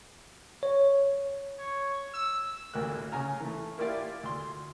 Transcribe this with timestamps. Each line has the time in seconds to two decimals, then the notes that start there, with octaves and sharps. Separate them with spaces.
0.63 C#5
1.59 C#5
2.14 E6
2.74 A1 D2 A#3 F#6
3.12 C#3 G#5 A#5 F6
3.40 E3 A3
3.78 A#3 E4 F4 G4 D5 F5
4.23 D2 C6